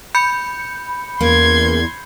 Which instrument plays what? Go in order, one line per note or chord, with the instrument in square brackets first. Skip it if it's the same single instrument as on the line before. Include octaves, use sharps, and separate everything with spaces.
[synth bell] B5 G6 C#7
[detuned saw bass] E2 [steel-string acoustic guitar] A#3 C#4 [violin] C6 G#6